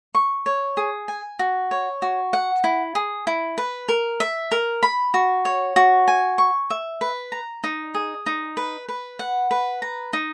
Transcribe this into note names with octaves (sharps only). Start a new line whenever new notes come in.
C#6
C#5
G#4
G#5
F#4
C#5
F#4
F#5
E4
G#4
E4
B4
A#4
E5
A#4
B5
F#4
C#5
F#4
G#5
C#6
E5
B4
A#5
D#4
G#4
D#4
B4
B4
F#5
B4
A#5
D#4